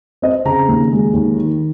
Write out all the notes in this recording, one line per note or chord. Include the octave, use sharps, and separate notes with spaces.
C4 D#5
C#3 A#5
D#2
G#3
D#2
D#3